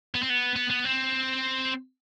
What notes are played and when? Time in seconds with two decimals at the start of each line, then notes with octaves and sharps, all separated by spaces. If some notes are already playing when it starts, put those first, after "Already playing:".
0.15 B3
0.23 C4
0.30 B3
0.56 B3
0.70 B3
0.84 C4